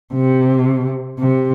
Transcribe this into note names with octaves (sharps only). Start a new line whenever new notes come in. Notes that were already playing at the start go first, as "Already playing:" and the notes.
C3
C3